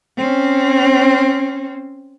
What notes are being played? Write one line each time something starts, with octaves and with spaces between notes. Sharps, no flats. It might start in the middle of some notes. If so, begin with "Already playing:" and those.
C4 C#4